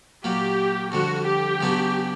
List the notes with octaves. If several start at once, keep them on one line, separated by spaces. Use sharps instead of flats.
A#2 F#3 A#3 G4
F2 D3 G3 F#4
G4
C#3 F#3 B3 D4